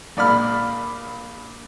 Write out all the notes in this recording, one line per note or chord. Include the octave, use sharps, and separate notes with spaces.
A#1 D5 B5 F6